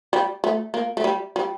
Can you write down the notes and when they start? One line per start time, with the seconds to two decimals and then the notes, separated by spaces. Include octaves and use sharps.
0.13 G3
0.44 A3
0.74 A#3
0.97 A3
1.04 G3
1.36 G3